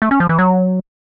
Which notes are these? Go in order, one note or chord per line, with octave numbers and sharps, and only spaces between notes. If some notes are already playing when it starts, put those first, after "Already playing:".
A3
C#4
F3
E3
F#3